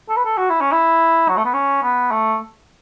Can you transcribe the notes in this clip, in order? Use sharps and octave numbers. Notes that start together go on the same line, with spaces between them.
A4
B4
A4
F#4
E4
C#4
E4
F#3
A3
B3
C#4
B3
A3